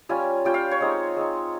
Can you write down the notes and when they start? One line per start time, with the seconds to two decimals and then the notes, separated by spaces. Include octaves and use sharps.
0.09 G3 C#4 F4 G#5
0.45 G3 C#4 F4 G5
0.54 F5
0.71 C#5
0.80 G#3 C4 D#4
1.17 G#3 C4 D#4